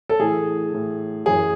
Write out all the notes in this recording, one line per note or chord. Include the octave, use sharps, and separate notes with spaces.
A4
A2 E3 G#4
A2 E3
F#2 E3 G#4